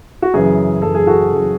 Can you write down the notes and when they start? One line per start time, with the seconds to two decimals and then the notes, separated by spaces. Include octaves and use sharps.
0.22 F#4
0.34 F#2 C#3 E3 G#4
0.82 F#2 C#3 E3 A4
0.95 G#4
1.07 F#4 A4
1.32 F#2 C#3 E3